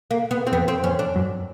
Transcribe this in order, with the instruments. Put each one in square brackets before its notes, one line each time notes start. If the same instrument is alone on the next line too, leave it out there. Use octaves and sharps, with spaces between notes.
[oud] A#3
B3
C4
[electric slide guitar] F2 [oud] B3
[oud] C4
[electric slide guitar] F2 [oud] C#4
[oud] D4
[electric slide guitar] F#2